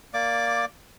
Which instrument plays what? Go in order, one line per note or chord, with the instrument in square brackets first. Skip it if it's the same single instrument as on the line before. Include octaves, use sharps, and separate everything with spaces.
[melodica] A#3 D5 D6